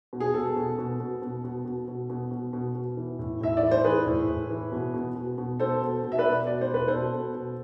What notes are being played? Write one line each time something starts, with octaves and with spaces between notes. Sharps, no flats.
B2
G#4
B2 A4
B2
B2
B2
B2
B2
B2
B2
B2
B2
B2
B2
E3
A2
A2 E5
D5
E3
C5
E3 G#4 B4
A2
A2
E3
B2
B2
B2
B2
B2 A4 C5
B2
B2
E5
B4 D5
B2
B2 D5
C5
B2 B4
B2 A4 C5
B2
B2